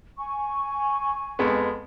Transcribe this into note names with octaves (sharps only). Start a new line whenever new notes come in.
G#5 C#6
F2 G#3 B3